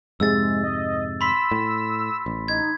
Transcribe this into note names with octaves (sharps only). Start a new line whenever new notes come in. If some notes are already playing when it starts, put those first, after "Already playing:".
F2 G#2 C3 G#3 E6 A6
D#5
B5 C6 E6 B6
A2
A1
D#4 G#6